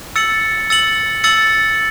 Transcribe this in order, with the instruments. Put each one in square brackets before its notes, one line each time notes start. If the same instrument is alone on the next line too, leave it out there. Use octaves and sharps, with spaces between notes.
[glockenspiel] E6 A6 C#7 F#7
E6 A6 C#7 F#7
E6 A6 C#7 F#7